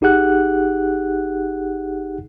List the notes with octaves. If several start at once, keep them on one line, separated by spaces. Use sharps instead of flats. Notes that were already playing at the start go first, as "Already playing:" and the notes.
G1 D#4 G4 G#4 F#5 F#6